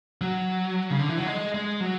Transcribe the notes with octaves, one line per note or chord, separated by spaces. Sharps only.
F#3
C#3
D3
E3
F#3
G#3
G#3
F#3